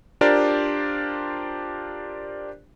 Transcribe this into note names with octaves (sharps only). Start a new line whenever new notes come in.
D4 F4 G4 A#4 C5 D5